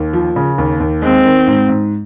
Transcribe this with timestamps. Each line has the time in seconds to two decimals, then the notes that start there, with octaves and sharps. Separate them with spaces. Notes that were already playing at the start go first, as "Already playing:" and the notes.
Already playing: D#2
0.13 F3
0.36 C#3
0.58 D#2
0.80 D#2
1.02 G#3 C4
1.25 D#3
1.48 G#2
1.69 G#2